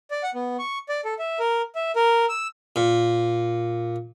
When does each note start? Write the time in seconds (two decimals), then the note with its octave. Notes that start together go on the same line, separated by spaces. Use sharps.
0.11 D5
0.23 F#5
0.35 B3
0.59 C#6
0.89 D5
1.05 A4
1.19 E5
1.40 A#4
1.75 E5
1.96 A#4
2.29 E6
2.76 A#2